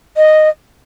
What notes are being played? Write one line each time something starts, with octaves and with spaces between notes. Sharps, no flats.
D#5